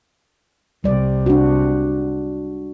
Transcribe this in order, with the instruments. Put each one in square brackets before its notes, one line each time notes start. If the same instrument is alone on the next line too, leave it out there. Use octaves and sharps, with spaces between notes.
[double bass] C2 C3 [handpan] G3 D5
[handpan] D4 F#4